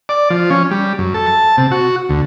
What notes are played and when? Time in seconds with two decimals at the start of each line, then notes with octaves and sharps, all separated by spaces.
0.09 D5
0.30 F3
0.50 C#4
0.71 G3
0.99 F#2
1.14 A4
1.27 A5
1.58 C3
1.71 F#4
2.09 D2